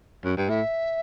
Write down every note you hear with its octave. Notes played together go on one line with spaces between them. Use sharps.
F#2
G2
A2 E5